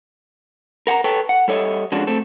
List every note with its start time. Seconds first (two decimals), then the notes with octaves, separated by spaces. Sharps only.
0.87 A#4 F#5 G#5 A#5
1.04 A4 B4 C#5 G5 A5
1.29 F#5
1.48 G3 A4 C#5 D#5 E5
1.92 F3 G#3 C#4 D4 F#4 A4
2.07 A3 C4 A4